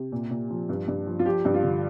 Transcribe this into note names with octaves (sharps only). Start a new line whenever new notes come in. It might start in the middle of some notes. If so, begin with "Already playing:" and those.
Already playing: C3
A#2
A#2
F3
G2
G2
F3
F4
F3 G4
G2
F4
D3